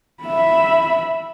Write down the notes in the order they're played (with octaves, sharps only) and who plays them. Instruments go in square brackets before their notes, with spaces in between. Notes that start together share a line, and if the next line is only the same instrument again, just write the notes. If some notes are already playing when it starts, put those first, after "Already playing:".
[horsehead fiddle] E5 B5